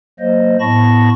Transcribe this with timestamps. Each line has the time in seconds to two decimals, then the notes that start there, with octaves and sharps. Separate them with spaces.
0.20 F#3 A#3 C5 D#5
0.60 A2 B3 A5 B5 C#6 A#6